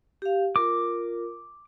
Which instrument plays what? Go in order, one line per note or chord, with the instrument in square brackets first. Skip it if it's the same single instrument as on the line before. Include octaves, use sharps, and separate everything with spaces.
[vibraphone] G4 F5
[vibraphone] F4 A#4 [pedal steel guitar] D6